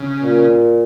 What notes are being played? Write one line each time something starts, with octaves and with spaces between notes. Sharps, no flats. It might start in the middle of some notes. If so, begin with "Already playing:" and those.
Already playing: C#3
A#2